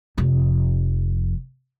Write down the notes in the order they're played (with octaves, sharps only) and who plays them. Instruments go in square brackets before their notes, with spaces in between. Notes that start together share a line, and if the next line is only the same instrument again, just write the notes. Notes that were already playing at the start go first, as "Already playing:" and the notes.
[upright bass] F1 F2